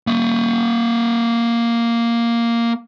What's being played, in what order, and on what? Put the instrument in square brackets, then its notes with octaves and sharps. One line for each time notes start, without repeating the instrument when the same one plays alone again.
[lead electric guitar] A#3 E5